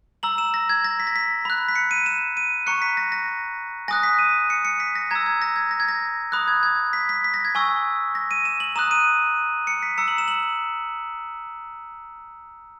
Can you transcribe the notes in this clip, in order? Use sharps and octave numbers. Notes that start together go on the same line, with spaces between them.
A#5 E6 F#7
E7
A#6
G#6
A#6
B6
A#6
B6
B5 F#6
B6
C#7
D#7
E7
D#7
A#5 C#6 F#6 C#7
B6
A#6
A#6
G#5 D#6 F#6 A#6
B6
D#7
C#7
C#7
B6
A#6
A#5 E6 G#6
G#6
A#6
G#6
A#6
G#6
A#6
B5 D#6 F#6
G#6
G#6
B6
B6
B6
A#6
G#6
G#5 C#6 E6
A#6
D#7
E7
F#7
A#5 D#6 F#6 E7
D#7
C#7
B6
A#5 E6 C#7
F#7
E7
F#7